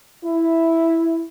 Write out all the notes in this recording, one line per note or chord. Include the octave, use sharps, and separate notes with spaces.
E4